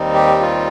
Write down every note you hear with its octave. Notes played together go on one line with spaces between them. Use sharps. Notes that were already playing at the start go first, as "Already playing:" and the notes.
Already playing: D#2 D#3 G3 C4 D#4
G4
F4